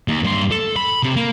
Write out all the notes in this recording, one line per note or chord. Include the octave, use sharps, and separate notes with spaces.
D#2
G2 C6
A4
B5
C3
A#3